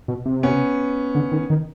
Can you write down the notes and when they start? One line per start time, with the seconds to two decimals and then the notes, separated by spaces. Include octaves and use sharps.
0.08 B2
0.26 C3
0.43 B3 C#4
1.15 D3
1.32 D#3
1.50 D#3